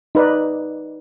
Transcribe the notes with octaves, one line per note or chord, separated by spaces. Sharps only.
D#4 B4 D5